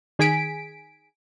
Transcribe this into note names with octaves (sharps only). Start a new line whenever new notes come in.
D#3 G#4 G#5 B6 D7